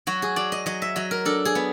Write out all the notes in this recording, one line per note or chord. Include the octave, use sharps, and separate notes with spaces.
F#3 F#4
G#4
F#3 D5
D#5
F#3 D#5
E5
F#3 D#5
A#4
D4 A4
G#4
B3